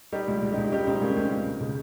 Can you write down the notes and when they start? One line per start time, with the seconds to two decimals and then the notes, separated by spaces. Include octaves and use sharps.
0.12 G3 D#4 G4
0.28 C#2
0.42 C#2
0.52 D#4 G4
0.57 C#2
0.72 G3 D#4 G4
0.87 C#2 C4 D#4
1.02 C#2 A#3 C#4
1.17 C#2 A#3 C#4
1.31 C#2
1.46 C#2
1.61 C#3